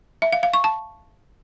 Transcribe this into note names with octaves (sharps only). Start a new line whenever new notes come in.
E5
F5
F5
C#6
A5